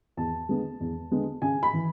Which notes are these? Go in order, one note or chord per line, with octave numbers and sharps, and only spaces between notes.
E2 A5
D3 G#3 B3
E2
D3 G#3 B3
C#3 G#5
B5
E3